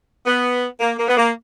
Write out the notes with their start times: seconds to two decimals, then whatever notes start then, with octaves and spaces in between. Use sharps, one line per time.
0.26 B3
0.80 A#3
0.98 A#3
1.08 B3
1.17 A#3